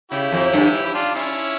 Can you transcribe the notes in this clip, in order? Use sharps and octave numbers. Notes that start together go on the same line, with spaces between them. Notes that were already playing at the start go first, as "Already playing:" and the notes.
C#3 E4 G4
F2
G2
E4
D4 F4
C#4 E4